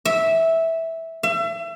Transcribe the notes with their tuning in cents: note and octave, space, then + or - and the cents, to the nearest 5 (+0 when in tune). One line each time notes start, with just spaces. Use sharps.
E5 -10
E5 +35